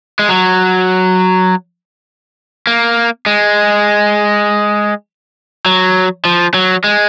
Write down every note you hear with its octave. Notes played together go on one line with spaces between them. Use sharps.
G#3
F#3
A#3
G#3
F#3
F3
F#3
G#3